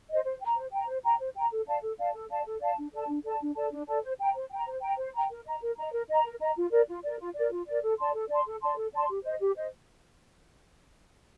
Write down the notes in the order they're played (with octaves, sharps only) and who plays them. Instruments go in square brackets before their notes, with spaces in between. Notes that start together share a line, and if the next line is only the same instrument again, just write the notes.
[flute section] C5 D#5
C5
G5
A#5
C5
G5 A#5
C5
G5 A#5
C5
G5 A#5
A4
D5 F5 A5
A4
D5 F5 A5
A4
D5 F5 A5
A4
D5 F5 A5
D4
A4 D5 A5
D4
A4 D5 A5
D4
A4 D5 A5
D4
A4 D5 A5
C5
G5 A#5
C5
G5 A#5
C5
G5 A#5
C5
G5 A#5
A#4
D#5 A#5
A#4
D#5 A#5
A#4
D#5 A#5
A#4
D#5 A#5
F4
A#4 D5
F4
A#4 D5
F4
A#4 D5
F4
A#4 D5
A4
D5 A5 C6
A4
D5 A5 C6
A4
D5 A5 C6
A4
D5 A5 C6
G4
C5 D#5
G4
C5 D#5